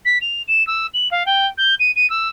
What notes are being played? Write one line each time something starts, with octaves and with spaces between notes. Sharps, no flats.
B6
F7
E7
E6
F#7
F5
G5
G6
D#7
D#7
E6